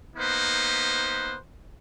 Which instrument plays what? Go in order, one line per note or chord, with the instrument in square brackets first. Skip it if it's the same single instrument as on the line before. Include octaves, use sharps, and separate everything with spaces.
[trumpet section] A#3 B3 D#4 B4 C5